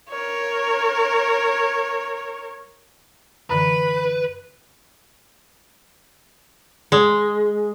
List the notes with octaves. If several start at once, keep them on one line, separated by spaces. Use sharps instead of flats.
A#4 C#5
F#2 D3 E3 B4 B5
G#3